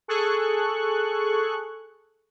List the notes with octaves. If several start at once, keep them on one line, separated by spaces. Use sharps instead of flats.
G#4 A4 C#6 F#6